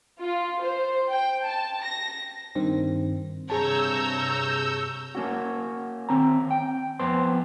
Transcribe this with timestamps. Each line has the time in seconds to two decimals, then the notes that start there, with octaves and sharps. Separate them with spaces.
0.21 F4
0.62 C5
1.12 G5
1.44 A5
1.84 A#6
2.55 G2 D#3 C4
3.50 G2 C3 G#4 C#5 A5 A#5 E6 G6
5.15 A#3 C#4 F#4
6.09 D#3 C4 A#5
6.51 G5
6.99 F2 B3 C5 C6